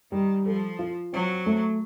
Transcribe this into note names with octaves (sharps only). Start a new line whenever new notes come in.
D#3 G3
F3 A4
F4
F#3 C4
A3